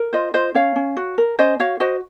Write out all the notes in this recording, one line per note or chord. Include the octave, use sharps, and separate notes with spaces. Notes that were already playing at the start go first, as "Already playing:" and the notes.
Already playing: A#4
F4 C5 D#5
F4 C5 D#5
C#4 C#5 F5
C#4
F#4
A#4
C#4 C5 D#5
F#4 C#5 F5
F#4 C5 D#5